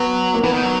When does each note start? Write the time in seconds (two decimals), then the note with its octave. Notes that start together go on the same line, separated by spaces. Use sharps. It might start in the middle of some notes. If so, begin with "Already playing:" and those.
Already playing: F#3 B3
0.34 A#3
0.43 E3 B3
0.53 D#3
0.63 F#3